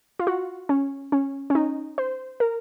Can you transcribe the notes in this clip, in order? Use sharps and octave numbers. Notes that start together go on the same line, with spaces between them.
F4
F#4
C#4
C#4
C#4
D#4
C5
A#4